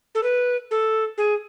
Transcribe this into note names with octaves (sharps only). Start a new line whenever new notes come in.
A4
B4
A4
G#4